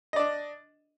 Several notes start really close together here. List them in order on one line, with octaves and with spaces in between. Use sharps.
D#5 D5 D4